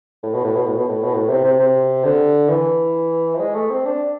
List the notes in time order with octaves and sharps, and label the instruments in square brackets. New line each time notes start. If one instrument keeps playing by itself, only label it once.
[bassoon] A2
B2
A2
B2
A2
B2
A2
B2
A2
C3
C3
C3
D3
E3
F3
G#3
A3
C4
D4